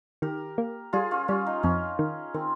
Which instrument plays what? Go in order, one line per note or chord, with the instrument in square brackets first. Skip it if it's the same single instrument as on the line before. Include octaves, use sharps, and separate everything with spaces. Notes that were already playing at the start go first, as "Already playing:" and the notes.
[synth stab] D#3 [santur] G4 A#4
[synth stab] A#3
[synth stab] G3 [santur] F4 G#4
[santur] C#4 F4
[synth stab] G3 [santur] C#4 F4
[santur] D#4
[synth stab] F2 [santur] C#4
[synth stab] D#3
[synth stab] D#3 [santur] C4